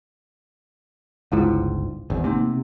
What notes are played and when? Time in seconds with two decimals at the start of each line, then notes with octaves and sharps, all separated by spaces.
1.32 G1 C#2 G#2 G#3 E4 F4
2.10 G#1 E2
2.24 C3 A3 A#3 D#4